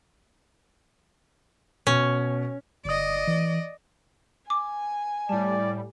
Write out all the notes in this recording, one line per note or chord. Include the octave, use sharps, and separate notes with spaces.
B2 C#4
G1 D5 D#5 D#6
E3
G#5 D6
A2 G3 D5 A5